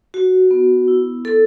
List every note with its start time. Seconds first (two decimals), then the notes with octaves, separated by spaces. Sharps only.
0.14 F#4
0.51 B3
0.88 E4
1.25 A4